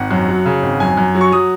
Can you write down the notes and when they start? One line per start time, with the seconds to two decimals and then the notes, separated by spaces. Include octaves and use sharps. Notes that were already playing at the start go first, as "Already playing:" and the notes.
Already playing: G#1 F#5
0.11 F#2
0.28 F#3
0.45 C#3
0.63 G#1
0.80 F#2 G#5
0.97 F#2
1.15 F#3
1.21 C#6
1.32 F#3 D#6